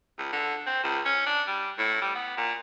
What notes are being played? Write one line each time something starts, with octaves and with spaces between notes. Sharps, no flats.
C#2
D3
C4
C#2
C#4
D4
G3
A2
G3
B3
A#2